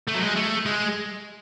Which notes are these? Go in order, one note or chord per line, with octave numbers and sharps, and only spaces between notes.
A3
F#3
G#3
A3
G#3